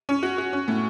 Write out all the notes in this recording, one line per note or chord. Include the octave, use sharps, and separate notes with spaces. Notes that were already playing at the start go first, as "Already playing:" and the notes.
C#4
F#4
F#4
C#4
A2